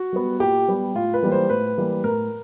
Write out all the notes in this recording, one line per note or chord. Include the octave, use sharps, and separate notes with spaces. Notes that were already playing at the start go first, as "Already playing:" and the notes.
Already playing: F#4
G3 B3
A#2 G4
G3 B3
A2 F4
B4
E3 G3 A#3
C5
A2 B4
E3 G3 A#3
A2 A#4